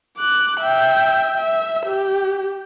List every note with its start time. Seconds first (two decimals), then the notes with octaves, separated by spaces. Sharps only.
0.17 D6 F#6
0.60 E5 G5
1.37 E5
1.86 G4